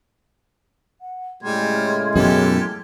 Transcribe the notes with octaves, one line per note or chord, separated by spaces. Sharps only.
F#5
A2 C#3 G3 G#3 C6 F6 G#6
F#2 B2 E3 G4 A4